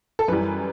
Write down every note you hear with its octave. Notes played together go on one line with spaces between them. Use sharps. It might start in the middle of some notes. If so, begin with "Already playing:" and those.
A4
F#2 E3 G3 B4